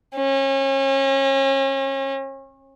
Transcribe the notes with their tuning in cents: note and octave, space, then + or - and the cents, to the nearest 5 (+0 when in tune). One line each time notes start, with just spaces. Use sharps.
C#4 -35